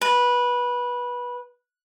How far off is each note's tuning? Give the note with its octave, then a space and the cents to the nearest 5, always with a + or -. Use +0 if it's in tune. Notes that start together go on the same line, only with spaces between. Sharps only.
B4 -15